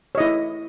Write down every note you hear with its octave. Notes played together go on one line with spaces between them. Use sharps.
E4 C#5 D#5